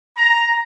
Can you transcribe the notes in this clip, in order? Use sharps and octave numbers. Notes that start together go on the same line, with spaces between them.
A#5